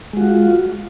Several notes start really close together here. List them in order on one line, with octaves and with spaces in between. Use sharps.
G#3 F#4 F4